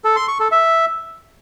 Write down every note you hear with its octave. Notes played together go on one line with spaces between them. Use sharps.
A4
C6
C#6
A4
E5